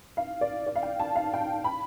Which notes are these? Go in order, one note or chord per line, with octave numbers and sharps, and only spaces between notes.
F5
D5
D5
F5
G5
A5
F5
G5
A5
B5